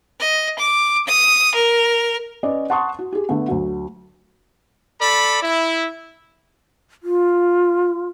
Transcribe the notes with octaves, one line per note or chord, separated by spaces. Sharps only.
D#5
D6
D#6
A#4
C#4 B4 D5 D#5
F#5 A5 C6 C#6 D#6
F#4
G4 G#4
D3 A3 B3
D2 F#3
A4 D5 B5
E4
F4